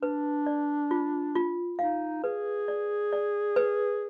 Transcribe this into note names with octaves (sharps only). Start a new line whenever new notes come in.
D4 B4
D5
F4
F4
D#4 F5
G#4 B4
D5
D5
B4